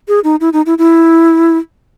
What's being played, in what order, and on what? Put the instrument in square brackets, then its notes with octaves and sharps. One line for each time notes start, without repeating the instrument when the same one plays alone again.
[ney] G#4
D#4
E4
D#4
E4
E4